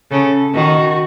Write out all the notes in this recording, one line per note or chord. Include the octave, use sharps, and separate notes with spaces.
C#3 A4
D#3 F#4